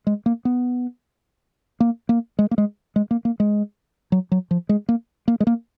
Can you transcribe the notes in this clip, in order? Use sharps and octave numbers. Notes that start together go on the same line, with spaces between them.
G#3
A#3
B3
A#3
A#3
G#3
A#3
G#3
G#3
A#3
A#3
G#3
F#3
F#3
F3
G#3
A#3
A#3
G#3
A#3